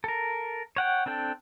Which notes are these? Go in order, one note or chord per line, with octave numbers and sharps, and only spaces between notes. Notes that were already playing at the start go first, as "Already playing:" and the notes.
A4 A#4
C#5 F#5 G5
C4 D4 A4 G5